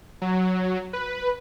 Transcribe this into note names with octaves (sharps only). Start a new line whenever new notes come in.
F#3
B4